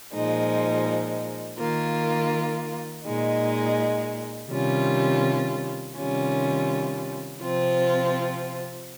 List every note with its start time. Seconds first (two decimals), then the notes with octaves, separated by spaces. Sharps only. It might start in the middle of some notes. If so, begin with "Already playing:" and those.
0.13 A#2 F3 G#3 D#4
1.59 D#3 A#3 F4
3.04 A#2 G#3 D#4
4.50 C3 D#3 G3 C#4 F4
5.96 C3 D#3 G3 C#4 F4
7.42 C3 F3 C4 F4